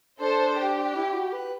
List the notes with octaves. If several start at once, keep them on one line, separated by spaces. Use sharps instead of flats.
D4 A4 C5
G4
E4
F#4
B4